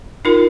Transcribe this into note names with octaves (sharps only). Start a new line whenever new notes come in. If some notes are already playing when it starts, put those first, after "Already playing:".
D#4 F4 A#4